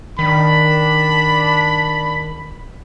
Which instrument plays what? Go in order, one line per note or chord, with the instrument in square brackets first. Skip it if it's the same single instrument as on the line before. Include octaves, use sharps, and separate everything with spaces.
[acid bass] D#3 [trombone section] D4 [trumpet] B5